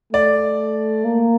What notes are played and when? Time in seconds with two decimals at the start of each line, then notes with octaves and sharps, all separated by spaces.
0.13 A3 D5
1.05 A#3